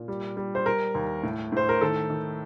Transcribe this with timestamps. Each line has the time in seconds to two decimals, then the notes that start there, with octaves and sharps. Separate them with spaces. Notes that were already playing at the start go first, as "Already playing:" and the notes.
Already playing: A#2
0.08 G3
0.37 G3
0.55 C5
0.66 G3 A#4
0.95 D#2
1.23 A2
1.52 A2 C5
1.69 A#4
1.81 D#3 A4
2.10 D#3